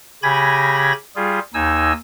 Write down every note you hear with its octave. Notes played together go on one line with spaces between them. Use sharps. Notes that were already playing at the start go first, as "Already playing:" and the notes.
C#3 G4 G#5 B5 G#6 A#6
G3 F4 G#4
D#2 D#4 G#5 E6